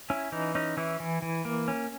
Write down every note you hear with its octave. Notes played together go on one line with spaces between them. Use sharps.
C#4 E4
E3 D#4
C#4 D#4
E3 E4
E3
E3
A#3
C#4